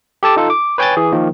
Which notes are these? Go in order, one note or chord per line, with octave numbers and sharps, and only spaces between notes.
G4 A4 A5 D6
D#4 F4 A4
D6
B4 C#5 G5 G#5 G6 A6
E3 G#4
D#3 F3 A#3